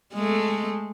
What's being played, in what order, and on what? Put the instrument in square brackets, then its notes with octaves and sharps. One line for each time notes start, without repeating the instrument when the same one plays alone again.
[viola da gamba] G#3 A3